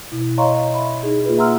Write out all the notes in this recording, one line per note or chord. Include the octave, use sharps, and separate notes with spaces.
B2 E4
C#5 D#5 F5 A#5 C6 C#6
E5 B5
D#4 G#4
A#3 F4 G#4 B4
E5 F#5 A#5 C6 E6 F6